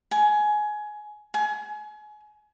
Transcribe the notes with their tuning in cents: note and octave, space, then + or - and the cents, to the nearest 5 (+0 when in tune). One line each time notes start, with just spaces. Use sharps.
G#5 +20
G#5 +30